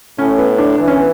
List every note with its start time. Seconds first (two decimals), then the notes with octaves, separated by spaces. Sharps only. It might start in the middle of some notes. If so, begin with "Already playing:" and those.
0.19 A2 C#4
0.38 B3
0.58 D4
0.78 E3 D4
0.88 C#4
0.97 B3